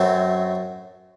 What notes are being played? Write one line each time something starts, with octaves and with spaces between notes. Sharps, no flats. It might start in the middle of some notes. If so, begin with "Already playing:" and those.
Already playing: F#2 F#3 A3 C4